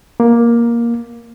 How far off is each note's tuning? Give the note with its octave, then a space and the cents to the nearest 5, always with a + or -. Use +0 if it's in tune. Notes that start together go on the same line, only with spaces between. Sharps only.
A#3 +10